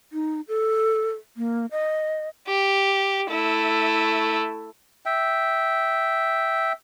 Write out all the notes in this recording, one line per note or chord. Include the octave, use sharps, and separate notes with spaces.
D#4
A4
A#3
D#5
G4
A3 E4
E5 G5